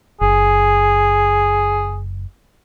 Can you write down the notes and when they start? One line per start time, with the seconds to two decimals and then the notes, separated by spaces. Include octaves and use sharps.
0.21 F#1 G#4